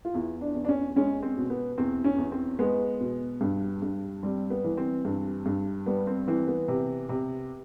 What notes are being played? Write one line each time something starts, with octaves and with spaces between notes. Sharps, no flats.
F4
E2 E4
D4
E2
D4
C#4
G#3 C#4
C4
B2
B3
E2 C4
C#4
E2
C4
G#3 B3
B2
G2
G2
G3 C4
B3
E3
C4
G2
G2
G3 B3
C4
E3 C4
B3
C3
C3